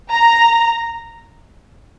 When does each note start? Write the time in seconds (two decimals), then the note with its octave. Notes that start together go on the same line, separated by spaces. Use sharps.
0.10 A#5